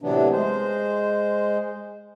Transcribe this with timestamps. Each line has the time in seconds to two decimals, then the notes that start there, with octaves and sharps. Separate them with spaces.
0.02 A2 C3 E3 F#3 B3 D4
0.32 G#3 C5